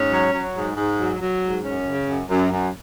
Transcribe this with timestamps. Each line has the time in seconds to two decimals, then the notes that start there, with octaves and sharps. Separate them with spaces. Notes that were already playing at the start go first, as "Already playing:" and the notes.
Already playing: G#2 C#4
0.11 F#3
0.32 F#3
0.55 G#2
0.77 G#2
0.97 F#3
1.20 F#3
1.42 G#2
1.63 F#2 C#4
1.86 C#3
2.08 F#2
2.29 F#2
2.51 F#2